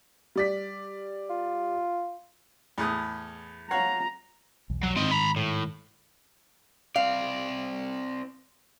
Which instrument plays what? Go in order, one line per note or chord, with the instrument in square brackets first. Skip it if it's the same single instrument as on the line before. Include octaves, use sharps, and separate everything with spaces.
[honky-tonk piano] G3 D5 B6
[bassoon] F4
[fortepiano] E2 A2 D#6
[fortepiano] C#5 F5 F#5 [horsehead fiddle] A#5
[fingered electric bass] B1 E2
[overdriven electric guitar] F#3
[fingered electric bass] G#2 D#3 [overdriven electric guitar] C4 D#5
[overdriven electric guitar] A#5 B5
A2
[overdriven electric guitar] C4 D5 [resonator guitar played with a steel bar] F5